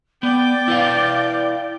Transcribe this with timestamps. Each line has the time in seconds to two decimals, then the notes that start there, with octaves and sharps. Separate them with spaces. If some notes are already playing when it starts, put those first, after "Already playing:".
0.23 B3 D5 G5 D6
0.68 E4 B4 F5